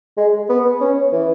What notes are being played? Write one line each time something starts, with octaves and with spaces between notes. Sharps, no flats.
G#3
B3
C#4
E3